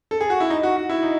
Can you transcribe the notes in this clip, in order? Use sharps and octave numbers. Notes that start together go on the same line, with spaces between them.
A4
G#4
F#4
E4
D#4
F#4
F#4
E4
D#4